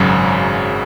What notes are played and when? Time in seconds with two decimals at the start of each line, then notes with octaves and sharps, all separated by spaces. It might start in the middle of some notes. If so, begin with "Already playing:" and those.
Already playing: G#1 F#2 C#3 F#3